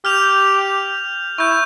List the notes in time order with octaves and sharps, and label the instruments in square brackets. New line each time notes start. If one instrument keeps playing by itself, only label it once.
[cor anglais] G4 [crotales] F6 G6 F7
[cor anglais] E4 [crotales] C#6 G6